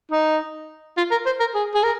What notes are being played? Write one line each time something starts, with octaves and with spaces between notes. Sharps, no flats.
D#4
F4
A#4
C5
A#4
G#4
G#4
A#4